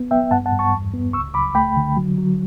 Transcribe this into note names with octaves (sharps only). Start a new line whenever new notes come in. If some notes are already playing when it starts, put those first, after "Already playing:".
Already playing: B3
B3 E5 G5
G2 F#5 A5
F#5 A5
G2
A5 C#6
E2
B3
C#2 C#6 E6
C#2 B5 D6
A3 G5 B5
D3
F#3
F#3